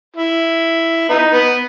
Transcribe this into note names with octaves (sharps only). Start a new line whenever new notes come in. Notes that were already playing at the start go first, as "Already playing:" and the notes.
E4
B3 D#4
B3